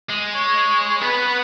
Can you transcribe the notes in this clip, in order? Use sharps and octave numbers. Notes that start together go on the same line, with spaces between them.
G#3
C#5
B3 B4